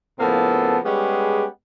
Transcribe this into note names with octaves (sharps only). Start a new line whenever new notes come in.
A2 C#3 F3 A#3 B3 A4
G3 G#3 B3 C#4 G4 G#4